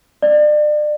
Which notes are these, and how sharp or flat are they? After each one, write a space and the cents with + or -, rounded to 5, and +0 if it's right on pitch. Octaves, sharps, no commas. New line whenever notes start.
D5 +35